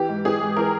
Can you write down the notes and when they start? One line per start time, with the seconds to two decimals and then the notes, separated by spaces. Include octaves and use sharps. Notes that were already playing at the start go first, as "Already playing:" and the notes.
Already playing: E3 G4
0.09 G#2
0.25 E3 G#4
0.41 G#2
0.57 E3 A#4